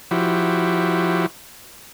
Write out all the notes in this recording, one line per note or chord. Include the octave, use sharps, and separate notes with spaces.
F3 E4 F#4 G4